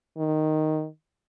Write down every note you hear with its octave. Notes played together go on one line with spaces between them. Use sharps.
D#3